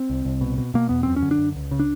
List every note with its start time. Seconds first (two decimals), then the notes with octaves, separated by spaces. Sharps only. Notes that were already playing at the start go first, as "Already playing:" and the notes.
Already playing: C4
0.10 C2
0.25 C2
0.41 B2
0.58 B2
0.74 B2 A#3
0.89 E2 B3
1.03 F#2 C4
1.16 C#4
1.22 D3
1.31 D4
1.38 F#2
1.55 C#2
1.71 C#3
1.79 D4